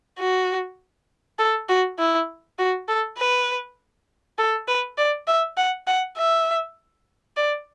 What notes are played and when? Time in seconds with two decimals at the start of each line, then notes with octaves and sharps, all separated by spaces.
0.19 F#4
1.39 A4
1.69 F#4
1.99 E4
2.59 F#4
2.88 A4
3.18 B4
4.38 A4
4.68 B4
4.98 D5
5.27 E5
5.57 F#5
5.87 F#5
6.17 E5
7.37 D5